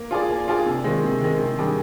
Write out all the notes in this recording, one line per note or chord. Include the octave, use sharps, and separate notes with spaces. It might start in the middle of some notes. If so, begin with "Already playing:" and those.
Already playing: A#3
F4 G#4 D5
A#3
F4 G#4 D5
C3
D#3 G#3 C4
C3
D#3 G#3 C4
C3
D#3 G3 D4 G#4